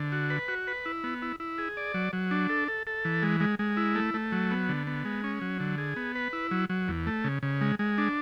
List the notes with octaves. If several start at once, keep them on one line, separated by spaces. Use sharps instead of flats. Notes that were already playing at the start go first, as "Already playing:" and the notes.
Already playing: D3
F#4
B4
F#4
B4
E4
B3
E4
E4
G#4
D5
F#3
F#3
D4
A4
A4
A4
E3
G#3
G#3
G#3
E4
A3
A3
F#3
B3
D3
B3
G#3
C#4
F#3
D3
G#4
B3
B4
E4
F#3
F#3
E2
A3
C#3
C#3
G#3
G#3
D4